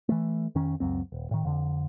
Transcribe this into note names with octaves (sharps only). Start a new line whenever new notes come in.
E3 A3
F2 D#3 C#4
C#2 F#2 C4
D#1
A2 D#3
F2 D3